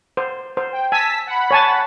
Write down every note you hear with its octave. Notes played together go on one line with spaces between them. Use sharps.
C5
C5
G5
G#5 A5 E6 B6
F#5 B5
C#5 G#5 A5